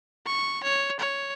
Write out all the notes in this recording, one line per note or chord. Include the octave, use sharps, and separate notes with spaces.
C#6
C#5
C#5